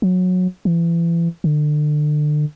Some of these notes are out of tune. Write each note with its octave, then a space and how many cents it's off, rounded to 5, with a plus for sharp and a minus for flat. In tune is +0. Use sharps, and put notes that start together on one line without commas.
F#3 -20
E3 +35
D3 +30